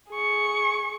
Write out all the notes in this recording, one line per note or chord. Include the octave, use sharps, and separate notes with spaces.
G#4 C#6